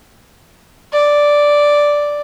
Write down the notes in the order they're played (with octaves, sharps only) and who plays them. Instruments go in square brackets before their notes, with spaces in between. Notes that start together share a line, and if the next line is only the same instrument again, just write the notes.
[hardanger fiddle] D5